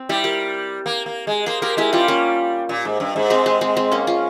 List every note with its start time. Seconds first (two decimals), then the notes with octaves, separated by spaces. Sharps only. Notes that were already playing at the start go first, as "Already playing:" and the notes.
Already playing: C4
0.09 G3 E4 G4
0.24 G4 A#4
0.86 A#3
1.06 A#3
1.27 G#3
1.46 A#3 G#4 C5
1.62 A#3 G4 A#4
1.77 G#3 E4 G4
1.93 G3 C#4 F4
2.08 A#3 C#4
2.69 A#2
2.85 G#2
3.00 G2
3.16 G#2
3.30 G#3 C4
3.46 G#3
3.61 G#3 C4
3.77 G#3 C4
3.92 A#3 C#4
4.07 C#4 F4